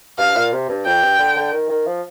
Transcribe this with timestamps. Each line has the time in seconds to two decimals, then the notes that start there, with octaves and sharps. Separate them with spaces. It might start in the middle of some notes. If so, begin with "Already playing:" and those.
0.18 G2 F5
0.35 A#2
0.52 C3
0.69 G2
0.86 F2 G5
1.02 G2
1.19 D3
1.36 D3
1.52 D#3
1.69 D#3
1.86 F3